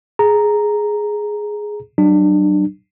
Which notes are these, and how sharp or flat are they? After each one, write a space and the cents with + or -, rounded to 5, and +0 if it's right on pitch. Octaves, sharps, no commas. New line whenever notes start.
G#4 +5 A#5 +0
F#3 +40 D4 +30